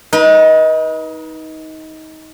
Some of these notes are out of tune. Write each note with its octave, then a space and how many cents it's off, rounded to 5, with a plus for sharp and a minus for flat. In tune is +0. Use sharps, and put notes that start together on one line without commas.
D#4 +20 B4 -30